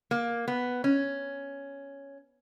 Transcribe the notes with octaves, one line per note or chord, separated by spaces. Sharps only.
A#3
B3
C#4